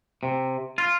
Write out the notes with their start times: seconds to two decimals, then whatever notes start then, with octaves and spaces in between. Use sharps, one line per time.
0.23 C3
0.78 F4